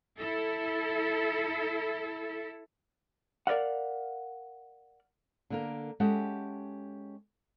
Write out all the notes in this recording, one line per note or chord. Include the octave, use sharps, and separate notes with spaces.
E4 A4
A#4 D5 D#5 F5 F#5
D3 A#3 A#4
G#3 C#4 G4 A4 E5 F#5